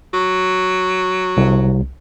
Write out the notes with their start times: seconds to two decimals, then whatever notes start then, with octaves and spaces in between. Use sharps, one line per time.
0.13 F#3
1.37 C2